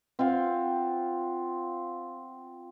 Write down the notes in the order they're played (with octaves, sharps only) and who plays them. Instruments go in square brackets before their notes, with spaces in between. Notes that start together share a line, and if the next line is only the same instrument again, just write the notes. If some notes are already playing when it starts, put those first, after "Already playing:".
[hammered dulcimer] C4 F4 F5 F#5